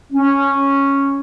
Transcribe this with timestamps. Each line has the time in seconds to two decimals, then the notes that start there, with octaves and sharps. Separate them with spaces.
0.13 C#4